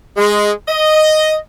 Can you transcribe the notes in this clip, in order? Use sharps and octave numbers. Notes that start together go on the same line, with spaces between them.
G#3
D#5